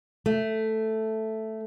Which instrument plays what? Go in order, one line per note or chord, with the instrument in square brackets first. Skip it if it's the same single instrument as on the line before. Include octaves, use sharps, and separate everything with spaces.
[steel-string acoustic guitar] A3